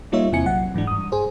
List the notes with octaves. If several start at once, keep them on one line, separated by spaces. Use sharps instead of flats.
G3 A#3 D#4 F4 C#5 E5
E2 C3 C4 E4 G#5 C#7
A#1 F#3 F#5
G#2 E3 G#3 D4
G2 D#6
G#4 C5